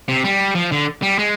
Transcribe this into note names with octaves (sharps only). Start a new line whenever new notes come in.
C3
G3
F3
D3
G3
G#3